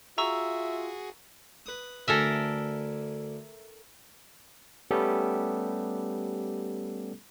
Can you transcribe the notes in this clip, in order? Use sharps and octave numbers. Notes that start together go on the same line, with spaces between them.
F4 F#4 G#4 E5 A#5 C#6 E6
B4 D#6
D2 D3 A4 A#4 E5 G#5
G3 A3 B3 C#4 G4 A4